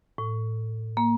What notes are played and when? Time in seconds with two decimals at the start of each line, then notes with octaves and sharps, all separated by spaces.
0.18 A2
0.97 A#3